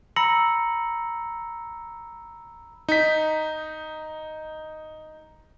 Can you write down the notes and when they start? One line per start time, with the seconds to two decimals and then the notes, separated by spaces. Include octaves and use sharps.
0.16 A#5 B5 E6 A#6 C#7 F#7
2.89 D#4 B6